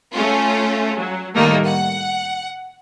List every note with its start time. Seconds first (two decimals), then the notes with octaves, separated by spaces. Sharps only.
0.14 A3 C#4 F4
0.98 F#3
1.35 A2 D#3 G3 A3 A#3 D#4
1.65 F#5